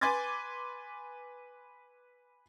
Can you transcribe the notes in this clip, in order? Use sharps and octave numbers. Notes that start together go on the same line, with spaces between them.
B4 G#5 C6 D6 G#6 A6